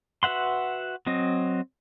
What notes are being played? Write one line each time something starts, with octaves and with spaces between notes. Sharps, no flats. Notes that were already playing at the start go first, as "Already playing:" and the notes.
F#4 B4 E5 F#5 C6
F#3 C4 D#5